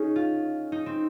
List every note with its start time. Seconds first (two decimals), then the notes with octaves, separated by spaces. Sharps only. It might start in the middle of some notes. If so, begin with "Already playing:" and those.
Already playing: C#4 D#4 G#4
0.16 F4
0.72 D#4
0.86 C4